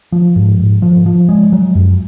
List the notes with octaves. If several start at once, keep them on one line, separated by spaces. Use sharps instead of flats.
F3
G#2
G#2
F3
F3
G#3
F#3
F#2